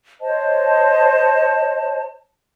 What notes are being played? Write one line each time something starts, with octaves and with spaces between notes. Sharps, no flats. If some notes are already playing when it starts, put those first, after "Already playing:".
C5 C#5 D#5 A5